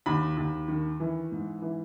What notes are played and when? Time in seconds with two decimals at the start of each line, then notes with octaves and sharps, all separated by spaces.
0.06 D#2 B5
0.37 D#2
0.68 D#3
1.00 E3
1.32 G#2
1.62 E3